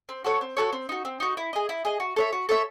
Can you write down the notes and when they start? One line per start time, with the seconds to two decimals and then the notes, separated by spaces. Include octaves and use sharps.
0.09 C4
0.24 F#4 A4 C#5
0.41 C4
0.57 F#4 A4 C#5
0.73 C4
0.89 D#4 F#4
1.05 C4
1.20 D#4 F#4
1.37 E4
1.53 G#4 D#5
1.69 E4
1.85 G#4 D#5
2.00 F#4
2.16 A4 C#5 E5
2.33 F#4
2.49 A4 C#5 E5